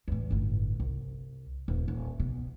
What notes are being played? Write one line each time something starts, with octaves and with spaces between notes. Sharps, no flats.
E2 A2
G1 A2
C2
D#1
D#1
B2